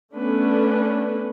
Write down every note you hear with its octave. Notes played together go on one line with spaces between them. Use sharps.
A3 B3 C#4 D4 A4 B4